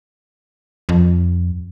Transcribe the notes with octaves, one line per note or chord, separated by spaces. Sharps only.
F2